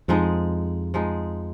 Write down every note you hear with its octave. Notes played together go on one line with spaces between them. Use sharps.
F2 F3 G#3 D#4
F3 G#3 D#4